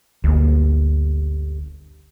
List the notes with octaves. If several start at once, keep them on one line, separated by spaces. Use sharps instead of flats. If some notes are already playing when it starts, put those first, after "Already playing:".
G1 D2 A#3